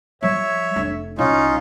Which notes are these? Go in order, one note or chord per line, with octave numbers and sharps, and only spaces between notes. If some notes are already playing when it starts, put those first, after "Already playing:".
F3 G3 C#5 E5
F1 D4
C2 C#4 D#4 F4